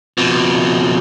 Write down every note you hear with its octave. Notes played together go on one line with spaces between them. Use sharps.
F2 B2